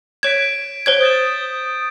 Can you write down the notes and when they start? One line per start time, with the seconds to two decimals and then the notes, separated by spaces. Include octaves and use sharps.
0.23 C#5 G#6 B6 D7 E7
0.86 C5 C#5 G#6
1.01 D#6 G6 A6 E7